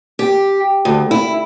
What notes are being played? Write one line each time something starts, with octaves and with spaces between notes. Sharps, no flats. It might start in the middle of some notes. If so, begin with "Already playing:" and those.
G4
D2
E4